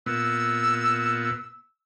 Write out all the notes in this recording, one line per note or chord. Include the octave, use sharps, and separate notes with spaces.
A#2 B3 E6